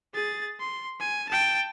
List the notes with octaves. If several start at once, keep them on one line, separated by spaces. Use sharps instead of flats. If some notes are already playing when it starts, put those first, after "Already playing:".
G#4 A6
C6
G#5
G5 A5